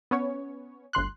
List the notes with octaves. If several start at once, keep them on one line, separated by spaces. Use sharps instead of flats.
B3 C#4 C#5
G1 D2 C6 F#6